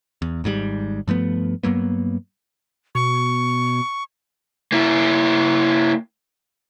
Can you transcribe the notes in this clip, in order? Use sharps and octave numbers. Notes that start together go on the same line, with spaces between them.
E2
G#1 G#2 B2 G3
G2 F3 A3 B3
G2 F#3 A#3 B3
B2 C#6
A#3 E4